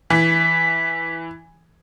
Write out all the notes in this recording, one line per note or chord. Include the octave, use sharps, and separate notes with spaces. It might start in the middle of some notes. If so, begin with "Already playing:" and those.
E3 B6